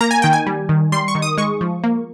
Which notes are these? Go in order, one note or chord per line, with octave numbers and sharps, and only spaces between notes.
A#3 A#5
G#5
D#3 G5
G#5
G3
D#3
G3 C6
C#6
D#3
D#6
G#3 C#6
F3
A#3